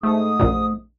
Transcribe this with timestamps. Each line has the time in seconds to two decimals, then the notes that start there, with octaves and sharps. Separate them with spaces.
0.03 G#2 A3 D#6
0.39 A#1 F#2 A#2